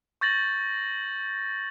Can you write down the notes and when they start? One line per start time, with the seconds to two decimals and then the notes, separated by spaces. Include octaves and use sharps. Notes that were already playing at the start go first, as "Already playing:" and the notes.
0.21 C#6 G6 A6 A#6 F#7